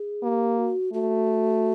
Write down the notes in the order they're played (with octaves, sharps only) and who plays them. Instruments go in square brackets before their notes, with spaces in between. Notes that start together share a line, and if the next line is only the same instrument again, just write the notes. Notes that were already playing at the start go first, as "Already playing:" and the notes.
Already playing: [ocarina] G#4
[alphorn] A#3 [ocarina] G4
[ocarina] F#4
[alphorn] A3 [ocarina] F#4